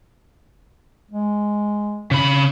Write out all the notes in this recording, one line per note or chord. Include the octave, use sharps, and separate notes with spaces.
G#3
C#3 B5